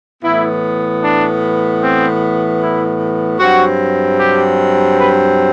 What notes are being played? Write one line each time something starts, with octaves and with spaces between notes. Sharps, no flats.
A2 E3 B3 E4
D4
C4
E4
G2 F#3 C4 F#4
G4
B4